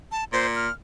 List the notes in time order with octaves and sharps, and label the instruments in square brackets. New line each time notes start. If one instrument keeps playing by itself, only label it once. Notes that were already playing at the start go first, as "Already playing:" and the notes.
[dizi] A5
[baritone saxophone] A#2 [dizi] C5
[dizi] F6